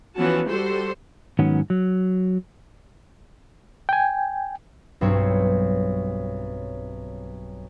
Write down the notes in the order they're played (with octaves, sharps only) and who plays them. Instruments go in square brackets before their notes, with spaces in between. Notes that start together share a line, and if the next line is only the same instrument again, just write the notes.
[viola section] E3 F3 B3 C#4 F#4 A5
G3 F#4 G4 A4 C5 C6
[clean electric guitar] G#2 D#3 F#3 B3 C#4
F#3
[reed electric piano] G5 G#5
[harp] B1 G2 C4 C#5